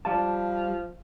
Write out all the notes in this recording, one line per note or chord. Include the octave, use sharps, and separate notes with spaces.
F3 G3 F5 A5